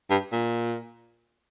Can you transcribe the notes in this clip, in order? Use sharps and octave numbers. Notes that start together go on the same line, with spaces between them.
G2
A#2